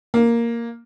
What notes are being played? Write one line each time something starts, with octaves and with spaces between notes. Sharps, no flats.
A#3